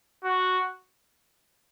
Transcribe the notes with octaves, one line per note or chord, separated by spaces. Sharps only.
F#4